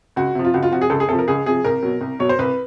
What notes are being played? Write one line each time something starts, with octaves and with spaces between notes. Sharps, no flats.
C#2 F#4
C3 F3
F4
C#2 F#4
F4
C3 F3 F#4
G#4
C#2 A4
G#4
C3 F3 A4
A#4
C#2 G#4
C3 F3 G#4
C2 A#4
B2 F#3
C2
B2 F#3 C#5
C5
C2 B4